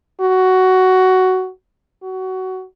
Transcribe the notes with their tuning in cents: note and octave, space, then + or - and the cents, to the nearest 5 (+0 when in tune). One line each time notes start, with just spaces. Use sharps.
F#4 +10
F#4 +20